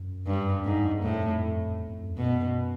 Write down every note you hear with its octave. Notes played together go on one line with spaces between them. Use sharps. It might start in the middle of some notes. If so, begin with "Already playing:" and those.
Already playing: F#2
G2
E2
F2 G#2
F2
G2
F2 A2
F2
E2
F2
F#2
B2